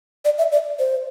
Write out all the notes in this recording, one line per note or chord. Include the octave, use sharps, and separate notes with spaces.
D5
E5
D5
C5